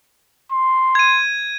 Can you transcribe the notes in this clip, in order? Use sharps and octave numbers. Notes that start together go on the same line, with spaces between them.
C6
G#6 D#7